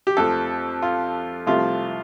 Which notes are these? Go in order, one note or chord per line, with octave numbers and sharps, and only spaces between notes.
G4
F2 F3 A3 A4
F4
C2 C3 F3 A3 F4